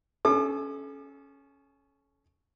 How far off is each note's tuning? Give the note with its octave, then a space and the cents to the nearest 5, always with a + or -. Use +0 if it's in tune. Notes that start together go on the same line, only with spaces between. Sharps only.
C#4 +0 A4 -35 D6 +40